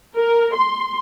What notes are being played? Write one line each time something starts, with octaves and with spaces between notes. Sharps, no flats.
A#4
C6